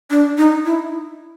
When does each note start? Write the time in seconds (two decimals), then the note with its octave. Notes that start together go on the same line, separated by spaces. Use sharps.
0.10 D4
0.37 D#4
0.65 E4